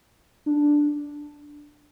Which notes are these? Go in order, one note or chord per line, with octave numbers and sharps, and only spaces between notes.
D4